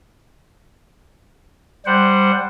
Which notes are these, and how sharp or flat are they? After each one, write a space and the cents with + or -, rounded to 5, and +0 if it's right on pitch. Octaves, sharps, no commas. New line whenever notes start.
G3 +0 C5 +0 F#5 +0